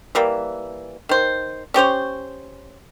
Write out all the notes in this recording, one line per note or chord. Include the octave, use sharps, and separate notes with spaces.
E3 G3 A#3
D#3 C5
C#4 G4 C5 C#5